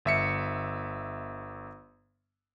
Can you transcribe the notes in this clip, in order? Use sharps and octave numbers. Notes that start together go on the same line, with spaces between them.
G1 E5 C#7